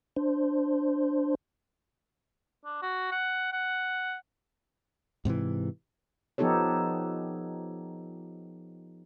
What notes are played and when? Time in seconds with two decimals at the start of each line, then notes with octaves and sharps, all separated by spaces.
0.16 D4 C5
2.65 D4
2.82 F#4
3.12 F#5
3.52 F#5
5.25 G#2 C3 D#3 E3
6.38 F3 B3 D#4 G4 A4 C#5